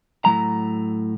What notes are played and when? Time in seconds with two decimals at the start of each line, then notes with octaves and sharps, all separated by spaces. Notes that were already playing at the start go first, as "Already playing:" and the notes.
0.25 A2 F#3 A#5